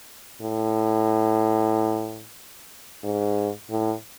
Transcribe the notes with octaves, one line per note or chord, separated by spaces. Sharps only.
A2
G#2
A2